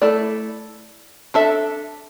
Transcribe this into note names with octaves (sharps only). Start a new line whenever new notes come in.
A3 E4 A4 D5
D4 A4 E5